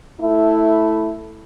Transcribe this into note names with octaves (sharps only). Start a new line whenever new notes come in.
A3 E4